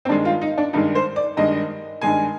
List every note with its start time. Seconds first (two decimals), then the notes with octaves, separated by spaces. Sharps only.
0.05 C4
0.09 G2 D#3 G#3 D4
0.25 F4
0.41 D#4
0.58 D4
0.73 G2 D#3 G#3 D#4
0.95 C5
1.16 D5
1.37 G2 D#3 G#3 D#5
2.02 G2 D#3 G#3 G#5